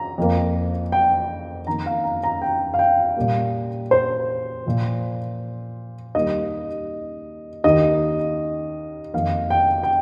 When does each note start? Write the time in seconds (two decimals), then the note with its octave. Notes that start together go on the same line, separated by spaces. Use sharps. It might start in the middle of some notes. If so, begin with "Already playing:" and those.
Already playing: A#5
0.18 F2 F3 A#3
0.92 G5
1.67 F2 D#3 A#3 A#5
1.86 F5
2.04 A#5
2.24 A#5
2.42 G5
2.74 F5
2.79 G5
3.16 A#2 G3 A#3
3.91 C5
4.66 A#2 F3 A#3
6.14 D#2 D#3 G3 A#3 D#5
7.64 D#2 D#3 A#3 D#5
9.14 F2 D#3 A#3 F5
9.50 G5
9.83 G5